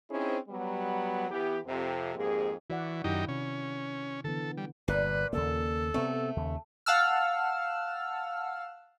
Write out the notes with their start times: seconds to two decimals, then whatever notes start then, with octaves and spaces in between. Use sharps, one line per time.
0.10 C4 C#4 D#4 E4 G#4 C5
0.49 F#3 G3 B3
1.29 E3 B3 G4
1.66 F2 C3
2.15 F2 G#2 A#3 G4 G#4
2.70 E3 F#4 D5 F#5
3.04 F#2 D#3 D#4 E4 G4
3.28 C3 C#4
4.24 D3 E3 B3 A4
4.57 G3
4.88 G1 A#2 B4
5.33 D#2 C#3 A#3 A4
5.94 C3 A3 B3 C4
6.37 D#2 C#3
6.86 F5 F#5 A5 E6 F6